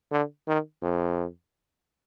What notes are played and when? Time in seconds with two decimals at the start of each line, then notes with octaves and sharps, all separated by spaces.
0.12 D3
0.48 D#3
0.83 F2